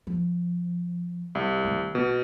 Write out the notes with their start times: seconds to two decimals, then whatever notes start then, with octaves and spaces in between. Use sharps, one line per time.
0.07 F3
1.35 C2
1.65 D#3 A3
1.95 A#1 B2